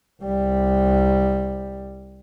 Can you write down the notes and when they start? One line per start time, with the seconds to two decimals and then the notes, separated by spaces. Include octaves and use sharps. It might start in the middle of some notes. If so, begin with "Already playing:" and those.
0.22 C2 G3